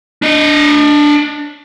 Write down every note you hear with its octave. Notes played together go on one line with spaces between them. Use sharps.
D4 D#5